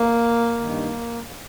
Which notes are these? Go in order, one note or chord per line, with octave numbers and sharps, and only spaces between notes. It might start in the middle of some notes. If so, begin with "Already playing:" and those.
Already playing: A#3
G2 D#3